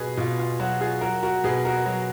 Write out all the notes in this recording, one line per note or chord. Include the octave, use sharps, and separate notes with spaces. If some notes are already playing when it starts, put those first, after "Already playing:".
Already playing: B2 F#3 G#4 B4
B2 F4
F4
F#3 F#4
F4 G#4
F#3 F#4 A#4
F#4 A#4
B2 G#4 B4
F#4 A#4
F#3